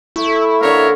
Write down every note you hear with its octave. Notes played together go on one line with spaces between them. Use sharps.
A3 E4
D3 A#3 A#4 C#5 E5